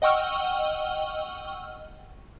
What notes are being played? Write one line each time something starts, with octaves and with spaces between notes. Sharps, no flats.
D#5 F#5 G5 C#6 E6 F6